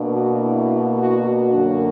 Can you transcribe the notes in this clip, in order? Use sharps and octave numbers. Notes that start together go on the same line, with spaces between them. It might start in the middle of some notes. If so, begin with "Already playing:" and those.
Already playing: B2 A#3 D4
F#4
E4
F#4
F#4
F#2 D3 F#3 A#3 D4